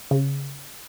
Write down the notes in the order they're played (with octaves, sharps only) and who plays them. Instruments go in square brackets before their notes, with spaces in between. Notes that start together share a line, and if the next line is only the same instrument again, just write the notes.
[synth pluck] C#3